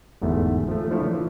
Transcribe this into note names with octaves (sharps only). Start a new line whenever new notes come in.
G1 E2 G#2 A3 B3
F3 A3
F3 A3 D4 E4 A4 C#5
E3 F3